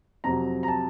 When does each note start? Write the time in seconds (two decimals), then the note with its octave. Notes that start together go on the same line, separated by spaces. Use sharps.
0.24 F2 C3 F#3 A#5
0.63 A#5
0.68 A5